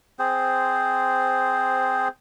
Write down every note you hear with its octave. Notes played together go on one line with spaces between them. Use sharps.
C4 G#4 C5